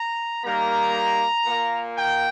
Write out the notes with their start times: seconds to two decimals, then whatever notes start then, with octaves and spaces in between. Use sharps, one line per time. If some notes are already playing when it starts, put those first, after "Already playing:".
Already playing: A#5
0.43 D#3 G3 A#3 A#5
1.45 A#2 A#3
1.96 G5